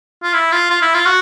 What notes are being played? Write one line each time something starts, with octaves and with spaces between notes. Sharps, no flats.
F4
E4
F4
F4
E4
F4
F#4